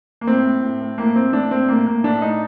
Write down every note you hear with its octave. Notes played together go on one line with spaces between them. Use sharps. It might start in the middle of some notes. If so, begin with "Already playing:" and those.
A#3
A2 C4
A2
A2
A2
A2 A#3
A2 C4
A2 D4
A2 C4
A2 A#3
A2 A#3
A2 D4
A2 D#4